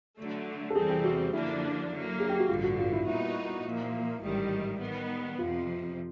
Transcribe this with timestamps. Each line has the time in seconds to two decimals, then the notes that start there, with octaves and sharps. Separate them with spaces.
0.18 D3 F#3 A3
0.70 A4
0.75 E2 C3 E3 G3 C4 G#4
0.90 G4
1.04 F#4
1.33 F#2 D3 F3 A#3 D4 E4
1.90 D3 F#3 A#3
2.20 G#4
2.29 G4
2.39 F#4
2.49 A1 G2 D3 F4
2.64 F#4
2.78 F4
2.92 E4
3.07 A#2 G3 B3 D#4 E4 F#4
3.64 A#2 F3 A#3
4.22 A1 G#2 D#3 G3
4.80 D#3 G3 B3
5.38 F2 C3 F3 F4